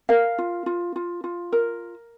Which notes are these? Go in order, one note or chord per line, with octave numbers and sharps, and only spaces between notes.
A#4 F5
F4
F4
F4
F4
A#4